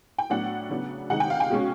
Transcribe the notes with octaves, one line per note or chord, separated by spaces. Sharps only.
G5
A2 F#3 B3 D4 F#5
C#3 F#3 B3 D4
C3 D#3 G#3 C4 D#4 F#5
G5
F5
G5
B2 G#3 C#4